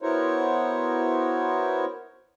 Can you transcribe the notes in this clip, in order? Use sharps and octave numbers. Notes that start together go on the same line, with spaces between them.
B3 E4 F#4 A#4 C5 C#5